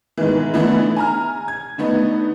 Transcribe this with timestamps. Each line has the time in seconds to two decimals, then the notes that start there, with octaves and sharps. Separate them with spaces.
0.17 G#2 B2 D#3 E3
0.54 D3 E3 A3 B3 D#4 E4
0.96 G#5 A#5 F6
1.48 G#6
1.78 D3 A3 B3 D#4